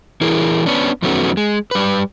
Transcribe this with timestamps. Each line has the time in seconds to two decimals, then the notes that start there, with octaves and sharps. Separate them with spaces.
0.21 E3 E4 G#4 A#4
0.66 B3 C#4 D4
1.02 F2 D#3 F#3 A3 B3 C#4
1.37 G#3
1.71 G3 B4